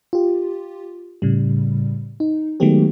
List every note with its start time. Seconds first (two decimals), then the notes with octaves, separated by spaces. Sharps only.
0.13 F4 G4
1.22 A2 C#3 G3
2.20 D#4
2.60 D#3 F#3 G#3 A3 B3 G4